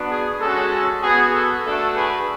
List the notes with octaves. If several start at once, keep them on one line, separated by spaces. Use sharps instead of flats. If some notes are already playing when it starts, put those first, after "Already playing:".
Already playing: B3 D4 F#4
G#4
G#3 C#4 F#4 A4
B3 F#4 G#4
A4
A3 D4 F#4 A4
G#4 B4